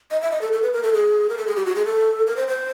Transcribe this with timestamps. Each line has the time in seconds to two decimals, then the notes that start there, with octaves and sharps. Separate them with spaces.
0.11 D#5
0.22 E5
0.31 D#5
0.41 A4
0.53 A4
0.63 B4
0.73 A#4
0.83 A4
0.93 G#4
1.29 A#4
1.38 A4
1.47 G#4
1.56 G4
1.66 F#4
1.76 G#4
1.86 A4
2.27 A#4
2.37 C5
2.48 C5